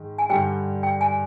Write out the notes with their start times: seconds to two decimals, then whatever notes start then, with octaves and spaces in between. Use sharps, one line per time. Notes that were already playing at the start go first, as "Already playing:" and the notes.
Already playing: G#2 D#3 G#3
0.18 G#5
0.29 G2 D3 G3 G5
0.83 G5
1.01 G#5